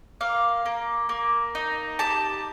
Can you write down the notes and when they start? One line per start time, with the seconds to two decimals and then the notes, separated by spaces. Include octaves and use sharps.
0.21 A#3 F5
0.65 A#3
1.09 A#3
1.55 D#4
1.99 G4 A5